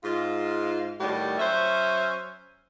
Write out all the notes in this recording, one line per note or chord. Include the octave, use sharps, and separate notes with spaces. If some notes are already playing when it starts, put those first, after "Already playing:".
G#2 F4
A2 D#3 G3 F#4 G4
F#3 C#4 C5 E5